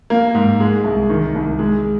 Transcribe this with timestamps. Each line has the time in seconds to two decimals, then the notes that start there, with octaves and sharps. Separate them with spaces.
0.10 A#3
0.34 G#2
0.60 G#3
0.84 C2
1.09 D#3
1.35 C2
1.59 G#3